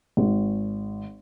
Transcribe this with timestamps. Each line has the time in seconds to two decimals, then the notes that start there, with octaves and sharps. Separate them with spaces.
0.17 G#1